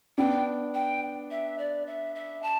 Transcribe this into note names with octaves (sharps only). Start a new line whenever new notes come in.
B3 D4 G5
G5
E5
D5
E5
E5
A5